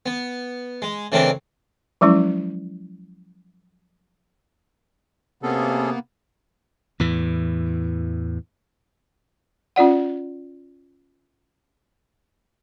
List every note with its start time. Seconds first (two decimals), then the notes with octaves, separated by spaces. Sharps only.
0.06 B3
0.82 G#3
1.12 C#3 E3 A3 C4 D4 A#4
2.01 F3 F#3 G#3 C#4 E4
5.43 C3 A#3 B3 C#4 G#4 A4
7.00 E2 A2 E3
9.76 C#4 F4 D5 F#5